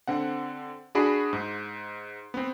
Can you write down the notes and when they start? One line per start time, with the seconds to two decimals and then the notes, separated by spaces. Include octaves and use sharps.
0.07 D3 C4 F#5
0.95 D4 F#4 G#4 B5
1.33 G#2
2.34 B3 C4